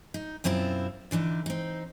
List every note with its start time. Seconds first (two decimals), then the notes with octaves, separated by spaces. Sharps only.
0.14 D#4
0.44 F#2 B2 C4 E4 F4
1.11 D3 E3 D4 D#4
1.46 C4 D#4